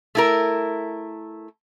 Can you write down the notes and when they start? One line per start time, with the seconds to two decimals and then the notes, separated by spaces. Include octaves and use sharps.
0.15 A3 E4 A#4